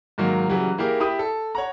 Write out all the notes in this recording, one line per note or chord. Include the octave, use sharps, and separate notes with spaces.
G#2 D#3 F#3 A#3
C#3 E3 F#3 G3
A#3 E4 G4 G#4 A#4
E4 G4 B5 D#6
A4
C#5 F#5 A#5